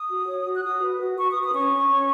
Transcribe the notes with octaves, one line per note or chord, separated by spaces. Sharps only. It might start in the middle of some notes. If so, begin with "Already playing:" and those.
Already playing: D#6
F#4
C#5
F#4
F#6
F#4 D#6
B4
F#4
B4 C#6
D#6
B4
D#6
C#4 C#6
C#4
C#4